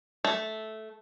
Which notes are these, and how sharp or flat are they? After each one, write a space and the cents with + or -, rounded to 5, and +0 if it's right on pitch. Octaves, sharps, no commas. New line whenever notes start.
A3 -10